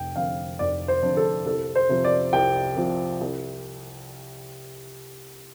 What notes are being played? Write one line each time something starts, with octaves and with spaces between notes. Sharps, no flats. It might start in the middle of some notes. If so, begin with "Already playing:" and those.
Already playing: F1 G5
F2 D3 F5
F1 D5
C5
F2 D3
A4
C2 A4
C5
C3 F3
D5
C2 G5
C3 F3
C2